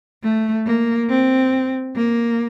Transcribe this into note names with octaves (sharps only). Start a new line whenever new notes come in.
A3
A#3
C4
A#3